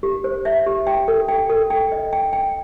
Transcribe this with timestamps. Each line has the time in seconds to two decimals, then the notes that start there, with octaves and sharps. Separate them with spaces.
0.03 G4
0.24 C5
0.45 E5
0.66 G4
0.87 G5
1.08 A4
1.28 G5
1.50 A4
1.70 G5
1.92 D#5
2.13 G5
2.33 G5